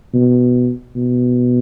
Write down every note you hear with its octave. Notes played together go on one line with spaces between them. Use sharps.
B2
B2